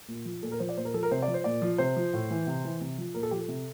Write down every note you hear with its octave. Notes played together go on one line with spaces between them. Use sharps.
A#2
F3
A#2 A4
A#4
F3 C5
D5
A#2 C5
A#4
F3 A4
A#4
C3 C5
D5
F3
C5
A#2 D5
F3
C3 C5
F3
A2
E3
C3
E3
C3
F3
A#2 A#4
A4
F3 G4
A4
C3